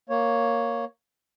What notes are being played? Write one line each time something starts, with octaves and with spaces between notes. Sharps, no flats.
A#3 C#5